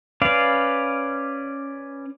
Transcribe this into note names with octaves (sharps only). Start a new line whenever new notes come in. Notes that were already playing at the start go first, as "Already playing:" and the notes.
C#4 B4 D5 F5